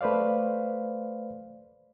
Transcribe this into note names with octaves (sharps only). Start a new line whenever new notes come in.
A3 B4 C5 D5 F5